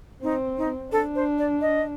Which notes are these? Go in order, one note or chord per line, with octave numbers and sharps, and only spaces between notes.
C4 D#4
D#4
D4 A4
C5
D5
D#5